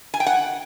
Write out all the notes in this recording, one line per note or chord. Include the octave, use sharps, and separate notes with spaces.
G#5
G5
F#5